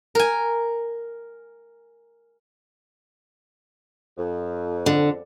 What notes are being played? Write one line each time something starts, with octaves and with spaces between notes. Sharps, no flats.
A#4 G#5
F2
D3